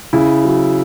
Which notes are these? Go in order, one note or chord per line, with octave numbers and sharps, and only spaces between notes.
C#3 E4
F#3